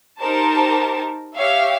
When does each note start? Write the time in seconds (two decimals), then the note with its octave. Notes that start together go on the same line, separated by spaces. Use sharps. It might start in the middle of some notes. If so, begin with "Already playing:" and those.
0.20 D#4 G4 A#4 C5 A5
1.35 G4 C#5 E5 F5